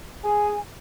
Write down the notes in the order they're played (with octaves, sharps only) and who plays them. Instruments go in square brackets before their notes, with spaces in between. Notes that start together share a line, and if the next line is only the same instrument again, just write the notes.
[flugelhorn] G#4 [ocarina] G#5